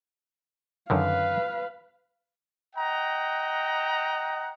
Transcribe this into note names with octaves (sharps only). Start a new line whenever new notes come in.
F#2 D3 D#3 B4 F5
D#5 F#5 G5 A#5